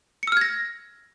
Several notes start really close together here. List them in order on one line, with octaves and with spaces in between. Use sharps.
C#7 E6 F6 G#6 A#6